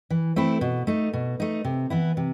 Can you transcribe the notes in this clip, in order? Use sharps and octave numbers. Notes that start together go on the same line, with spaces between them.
E3
A3 C4 E4
B2
A3 D#4
B2
A3 D#4
C3
E3 B3 E4
C3